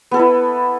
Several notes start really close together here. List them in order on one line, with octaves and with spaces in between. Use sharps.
B3 A4 B4 E4